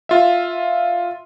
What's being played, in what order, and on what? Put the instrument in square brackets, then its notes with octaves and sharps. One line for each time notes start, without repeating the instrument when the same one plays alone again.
[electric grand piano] F4 E5